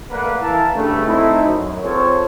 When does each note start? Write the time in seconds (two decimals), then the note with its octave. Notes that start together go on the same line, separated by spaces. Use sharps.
0.11 A3 A#3 B4 D5 F5 F#5
0.42 E3 E4 A#4 F5 A5
0.75 G2 C#3 A3
1.05 A3 C4 D#4 E4
1.44 F#2
1.83 C4 F4 G#4 A4 C5 C#5